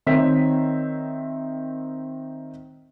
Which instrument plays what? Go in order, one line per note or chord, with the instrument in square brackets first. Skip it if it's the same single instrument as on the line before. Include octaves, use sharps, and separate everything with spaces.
[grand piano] D#3 C4 C#5 E5 B6